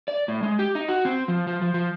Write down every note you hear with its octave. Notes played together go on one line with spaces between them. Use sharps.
D5
A2
G#3
G4
D#4
F#4
C4
F3
F3
F3
F3